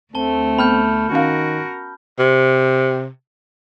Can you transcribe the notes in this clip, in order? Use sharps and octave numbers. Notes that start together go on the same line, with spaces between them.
D2 A3 C4 A5 G7
B3 B5 F6 G6
D#3 C#4 F#4 A#4 F5
C3